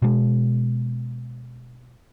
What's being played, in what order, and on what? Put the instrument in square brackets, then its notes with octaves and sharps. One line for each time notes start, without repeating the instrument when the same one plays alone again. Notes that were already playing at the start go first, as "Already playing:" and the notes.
[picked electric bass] B2 G#3